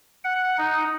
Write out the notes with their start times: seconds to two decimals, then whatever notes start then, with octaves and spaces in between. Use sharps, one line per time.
0.24 F#5
0.58 D#4